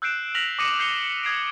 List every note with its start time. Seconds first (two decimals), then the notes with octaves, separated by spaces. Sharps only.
0.02 E6 F#6 G6 C7 D7 E7
0.35 F6 F#6 A#6 B6 F7 F#7
0.59 D6 D#6 A#6 C#7 D#7
0.79 G6 C7 C#7 G7
1.23 D#6 G#6 C7 D7